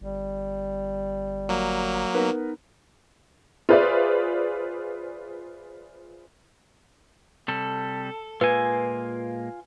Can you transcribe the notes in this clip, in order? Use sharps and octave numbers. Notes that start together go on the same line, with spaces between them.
G1 G3
F#3 A#3
B3 D#4 A#4 B4
F4 G#4 B4 C5 D5 E5
C3 G3 A4
A#2 G#3 A#3 F4 B4 G#5